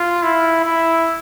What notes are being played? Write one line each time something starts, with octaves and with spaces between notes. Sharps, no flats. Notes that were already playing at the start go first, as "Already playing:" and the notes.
Already playing: F4
E4
E4